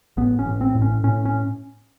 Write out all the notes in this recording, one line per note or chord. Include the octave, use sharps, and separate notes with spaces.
A1 B3
C#4
A1
C4
A2
C#4
A2 C#4
C#4